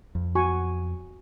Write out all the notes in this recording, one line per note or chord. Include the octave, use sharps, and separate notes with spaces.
F2
F#4 G#5 C#6